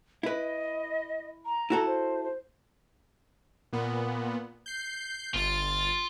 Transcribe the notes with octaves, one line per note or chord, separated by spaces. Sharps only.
E4 B4 D#5
A#5
E4 F#4 A4
C5
C5
A#2 B3
G6 C7
G1 F4 A6